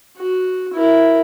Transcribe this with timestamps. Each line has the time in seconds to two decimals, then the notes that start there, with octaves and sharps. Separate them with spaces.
0.18 F#4
0.74 E4 A#4